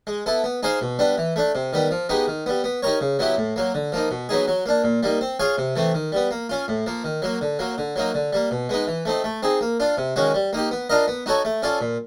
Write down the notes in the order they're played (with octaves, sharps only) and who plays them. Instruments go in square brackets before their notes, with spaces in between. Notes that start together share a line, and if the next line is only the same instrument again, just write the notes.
[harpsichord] G#3
B3 E4 A4
B3
D#4 G#4 C5 F5
B2
G3 B3 D4
E3
A3 D4
C3
D#3 G3 B3
F3
G#3 B3 D#4 G4
D#3
G3 B3
B3
D#4 G4 A#4 C#5
C#3
F#3 B3 E4 G4
A2
F#3 A#3
D3
F3 A#3 D#4
B2
F#3 B3 D#4 G#4
F#3
A#3 D4
A#2
G3 A#3 D#4
C4
F4 G#4 C#5 F5
C3
E3 A3 C4
D#3
G3 B3
A#3
C#4 F4
A2
F3 A#3
D#3
F#3 A#3
D3
F#3 A#3
D3
F#3 A#3 D#4
D3
G3 A#3
B2
G#3 B3 D#4
E3
A3 C4 D#4
A3
C4 D#4 G#4
A#3
D4 F4
C3
D#3 G#3 C#4 F#4
G3
A#3 D#4 G4
B3
D4 F4 A#4 D#5
B3
D#4 F#4 A4 C#5
A3
C#4 F4 A4 D5
A#2